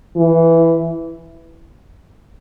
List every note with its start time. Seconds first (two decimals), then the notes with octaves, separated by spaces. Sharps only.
0.17 E3